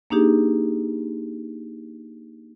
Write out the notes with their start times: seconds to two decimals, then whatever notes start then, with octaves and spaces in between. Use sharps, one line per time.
0.10 A#3 D4 D#4 G4 G#4